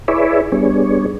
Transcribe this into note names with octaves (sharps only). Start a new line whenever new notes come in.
E4 G#4 B4 C#5 D5 E5
G3 B3 D4 G#4 C#5